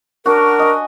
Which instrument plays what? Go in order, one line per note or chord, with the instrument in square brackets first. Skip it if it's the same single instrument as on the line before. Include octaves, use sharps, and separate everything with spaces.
[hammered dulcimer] D4 F#4 [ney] A#4
[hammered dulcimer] D#5 G#5